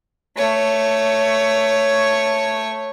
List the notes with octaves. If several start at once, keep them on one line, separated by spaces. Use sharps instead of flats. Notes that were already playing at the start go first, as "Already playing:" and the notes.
A3 C#5